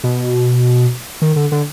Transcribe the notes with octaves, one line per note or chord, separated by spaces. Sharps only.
B2
D#3
D3
D3